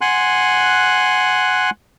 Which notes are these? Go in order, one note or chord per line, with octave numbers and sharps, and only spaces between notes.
F#5 G#5 C6 F#6